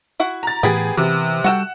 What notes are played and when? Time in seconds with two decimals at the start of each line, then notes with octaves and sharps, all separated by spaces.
0.20 E4 F#4 F#5
0.43 A#5 A6
0.63 A2 E3 B3 G4 G#4 A#4 B5
0.97 C3 E3
1.44 G3 F#4 A4 F#5 G5 E7